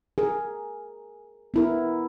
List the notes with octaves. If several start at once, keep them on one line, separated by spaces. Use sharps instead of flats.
G#4 A#4
B3 E4 A#4